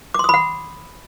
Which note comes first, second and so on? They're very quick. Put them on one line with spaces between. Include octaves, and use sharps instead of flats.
D6 C6 D#6 B5 F#5